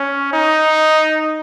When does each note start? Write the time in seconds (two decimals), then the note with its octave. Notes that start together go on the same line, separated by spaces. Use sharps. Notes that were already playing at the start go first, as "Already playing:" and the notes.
Already playing: C#4
0.33 D#4